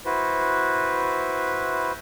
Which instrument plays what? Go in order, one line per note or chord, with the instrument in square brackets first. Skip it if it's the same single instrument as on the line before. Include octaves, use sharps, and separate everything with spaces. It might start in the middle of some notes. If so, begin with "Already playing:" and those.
[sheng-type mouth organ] E4 F#4 B4 C5